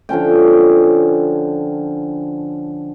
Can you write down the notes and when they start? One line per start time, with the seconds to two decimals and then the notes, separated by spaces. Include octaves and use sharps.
0.09 D3 F3 C#4 G5